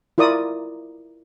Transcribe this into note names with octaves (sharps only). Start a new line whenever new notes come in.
E4 F4 A#4 D5 D#6